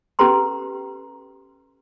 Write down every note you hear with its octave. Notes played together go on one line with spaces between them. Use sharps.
C#4 G4 A4 B4 A#5 C6